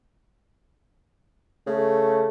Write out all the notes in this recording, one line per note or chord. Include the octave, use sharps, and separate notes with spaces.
C#3 A3